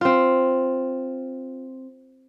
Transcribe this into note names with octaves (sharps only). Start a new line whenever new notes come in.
C4 F4